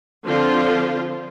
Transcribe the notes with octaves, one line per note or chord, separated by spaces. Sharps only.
D3 F3 C4 F4 C5